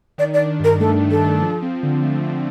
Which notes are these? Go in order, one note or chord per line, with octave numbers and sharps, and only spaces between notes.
D#3 D5
D5
D4
G2 A#4
A3 A4
D#3
A4
D4
F3
C4
D3
A3
F3